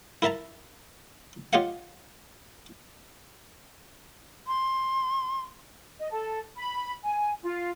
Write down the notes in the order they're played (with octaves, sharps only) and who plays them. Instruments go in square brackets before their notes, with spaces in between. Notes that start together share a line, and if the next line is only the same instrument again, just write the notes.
[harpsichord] E4 A#4 E5 A5 A#5
F4 G4 C#5 D#5 F5 F#5
[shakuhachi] C6
[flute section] D#5
A4
B5
G#5
F4